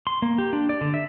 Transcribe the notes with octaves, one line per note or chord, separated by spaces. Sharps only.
C6
A#3
G4
D4
D5
D3
E5